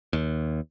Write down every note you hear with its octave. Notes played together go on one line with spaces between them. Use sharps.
D#2